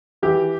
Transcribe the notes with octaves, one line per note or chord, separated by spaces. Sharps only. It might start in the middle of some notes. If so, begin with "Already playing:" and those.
E3 G4